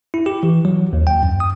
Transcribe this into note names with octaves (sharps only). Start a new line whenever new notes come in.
E4
G4
E3
F#3
D#2
G5
F#2
D#6